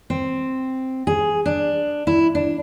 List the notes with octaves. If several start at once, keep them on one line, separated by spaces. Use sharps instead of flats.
C4
G#4
D4
E4
D4